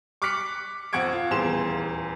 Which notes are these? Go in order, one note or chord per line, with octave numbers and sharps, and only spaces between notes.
C#6 D6 F6 F#6 B6 C#7
F2 F#5 C#6 G#6 D7
F4
D#1 E2 C6 E7